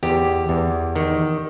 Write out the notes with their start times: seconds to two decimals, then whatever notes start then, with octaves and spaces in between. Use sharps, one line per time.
0.03 E2 G4
0.49 E2
0.96 D#3